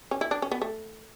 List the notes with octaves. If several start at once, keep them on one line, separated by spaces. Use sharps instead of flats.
C#4
E4
D4
C#4
B3
A3